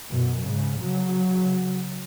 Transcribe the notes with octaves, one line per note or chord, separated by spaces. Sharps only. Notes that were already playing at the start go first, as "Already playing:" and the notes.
F#2 B2
G#2 C#3
C#3 F#3